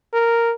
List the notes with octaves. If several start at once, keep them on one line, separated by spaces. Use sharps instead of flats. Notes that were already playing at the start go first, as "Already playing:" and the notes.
A#4